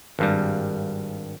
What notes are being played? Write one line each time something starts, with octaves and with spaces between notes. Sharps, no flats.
G#1 G2 G3